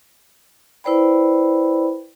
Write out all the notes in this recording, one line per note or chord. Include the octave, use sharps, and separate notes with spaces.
E4 B4 C5 D5 G5 B5